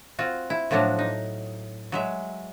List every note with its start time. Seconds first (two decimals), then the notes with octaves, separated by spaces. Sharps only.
0.19 C4 F4 F#4
0.50 E4
0.71 A2 F3 F#3 D4 F#4
0.99 D#4
1.92 F#3 G#3 E5